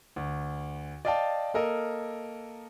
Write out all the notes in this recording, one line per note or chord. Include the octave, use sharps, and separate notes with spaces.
D2
D5 D#5 F5 G5 A5
A#3 A4 A#4 D#5